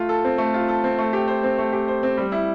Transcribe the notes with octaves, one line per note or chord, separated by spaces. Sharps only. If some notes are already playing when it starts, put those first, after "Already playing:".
Already playing: A3 F4
A4
C4
A3
F4
A4
C4
A3
G4
C5
C4
A3
G4
C5
C4
G3
E4